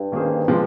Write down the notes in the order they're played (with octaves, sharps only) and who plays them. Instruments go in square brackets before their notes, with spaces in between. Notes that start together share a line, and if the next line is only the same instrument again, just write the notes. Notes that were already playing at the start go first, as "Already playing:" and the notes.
Already playing: [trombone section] G2
[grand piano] D#3 A#3 C#4 G#4 C5
C3 F3 G#3